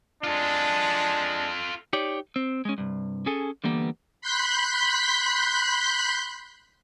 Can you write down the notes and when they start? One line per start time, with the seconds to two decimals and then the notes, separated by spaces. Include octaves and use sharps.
0.24 G#3 D4 F4 A4
1.93 D#4 G4 C#5 D5
2.36 C4
2.65 G#3 C#4
2.78 C2 G2
3.26 C#4 G#4 A4 G#5
3.64 D3 E3 G3 A#3 B3
4.21 B5 C6 F#6 G6 B6